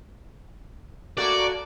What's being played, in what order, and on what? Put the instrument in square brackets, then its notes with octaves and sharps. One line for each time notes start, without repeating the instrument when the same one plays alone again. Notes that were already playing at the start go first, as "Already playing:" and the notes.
[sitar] A3 A#3 F#4 [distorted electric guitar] D5